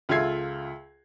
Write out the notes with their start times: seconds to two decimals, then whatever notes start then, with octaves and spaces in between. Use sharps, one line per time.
0.09 C#2 F4 A4 E5 G#6 C7